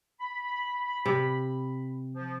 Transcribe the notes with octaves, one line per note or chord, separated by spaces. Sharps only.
B5
C3
F3